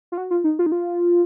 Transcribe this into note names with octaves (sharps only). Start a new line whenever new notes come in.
F4
F#4
F4
D#4
F4
D#4
F4